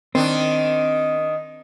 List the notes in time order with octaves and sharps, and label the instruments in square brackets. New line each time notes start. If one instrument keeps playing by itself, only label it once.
[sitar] D#3 D4 [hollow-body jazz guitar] C4